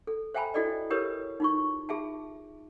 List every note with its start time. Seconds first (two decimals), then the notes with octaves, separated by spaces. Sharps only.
0.07 A4
0.34 C5 E5 G5 G#5 A#5 B5
0.54 E4 F#4 A4 D5 D#5
0.90 E4 G4 A#4 B4 C#5 D#6
1.40 D#4 F4 C#6
1.89 F4 G#4 E5 A5